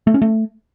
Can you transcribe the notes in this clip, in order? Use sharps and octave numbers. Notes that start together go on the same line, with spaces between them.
A3
C#4
A3